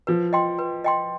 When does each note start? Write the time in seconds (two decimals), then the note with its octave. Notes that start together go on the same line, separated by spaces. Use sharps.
0.07 F3 B4
0.33 D#5 G5 C6
0.59 B4
0.84 D#5 G5 C6